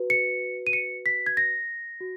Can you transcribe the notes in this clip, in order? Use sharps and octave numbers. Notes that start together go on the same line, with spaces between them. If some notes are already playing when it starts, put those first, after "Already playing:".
Already playing: F#4 B4
C#7
D#7
C#7
B6
G#6
A#6
F#4